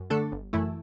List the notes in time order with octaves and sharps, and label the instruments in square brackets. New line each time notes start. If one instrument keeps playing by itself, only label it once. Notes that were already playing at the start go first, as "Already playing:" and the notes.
Already playing: [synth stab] F#2
D3 A3 D4 A4
G1
F#2 E3 A3 E4